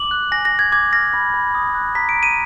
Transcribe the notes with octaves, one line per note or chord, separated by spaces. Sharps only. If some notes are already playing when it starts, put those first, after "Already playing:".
Already playing: D6 F#7
F#6
G#5 A#6
A#6
G#5
G#6
D6 G#6
F6 A#6
B5
B5
D#6
F#6
A#5 B6
D7
A#5
D#7